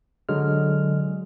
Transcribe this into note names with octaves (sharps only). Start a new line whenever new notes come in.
D3 F#3 G#3 F6